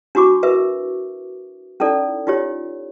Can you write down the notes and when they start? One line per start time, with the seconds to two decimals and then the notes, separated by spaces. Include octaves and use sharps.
0.15 D4 E4 F#4 C#6 D6
0.43 A#4 B4 E5
1.80 C#4 D#4 E4 A4 D5
2.27 D#4 F4 G4 C#5